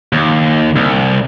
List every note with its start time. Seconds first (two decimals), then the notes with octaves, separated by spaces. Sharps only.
0.13 D#2
0.76 C2